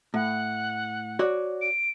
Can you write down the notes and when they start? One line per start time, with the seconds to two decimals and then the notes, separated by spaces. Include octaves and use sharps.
0.14 A2 F#5
1.19 F#4 C#5 D5
1.61 D7